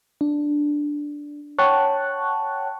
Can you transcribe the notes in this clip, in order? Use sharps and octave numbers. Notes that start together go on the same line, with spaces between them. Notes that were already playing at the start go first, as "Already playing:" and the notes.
D4
C#5 F#5 G5 A5 C#6 F#6